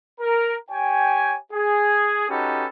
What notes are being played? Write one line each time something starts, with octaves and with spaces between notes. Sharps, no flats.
A#4
G4 C#5 G5 G#5
G#4
C#4 D#4 F#4 G4 A4 B4